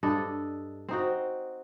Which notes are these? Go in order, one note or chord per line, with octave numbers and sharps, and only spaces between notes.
G2 D4 A4 D#5
C4 D#4 F#4